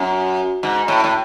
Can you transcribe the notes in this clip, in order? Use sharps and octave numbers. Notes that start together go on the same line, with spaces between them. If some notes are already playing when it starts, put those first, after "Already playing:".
Already playing: F#2
G#2
A2
A2